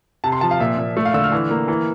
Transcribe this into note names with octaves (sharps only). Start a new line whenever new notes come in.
C3 A5
C6
F3 A5
F5
A#2 E5
A#2
A3 E5
F5
D3 E6
F6
E3
A#3
E3